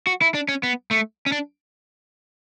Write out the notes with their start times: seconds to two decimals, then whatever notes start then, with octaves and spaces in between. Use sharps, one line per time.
0.07 F#4
0.22 E4
0.34 D4
0.48 C#4
0.63 B3
0.91 A3
1.26 C#4
1.32 D4